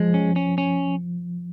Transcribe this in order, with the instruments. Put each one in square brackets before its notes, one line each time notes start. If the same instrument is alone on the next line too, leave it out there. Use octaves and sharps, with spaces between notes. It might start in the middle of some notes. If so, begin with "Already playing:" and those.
Already playing: [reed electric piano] F3 [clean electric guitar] G#3
[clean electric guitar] C#4
C#4
C#4